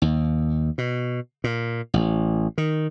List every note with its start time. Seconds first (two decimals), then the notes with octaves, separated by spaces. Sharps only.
0.02 D#2
0.78 B2
1.44 A#2
1.94 A1
2.58 D#3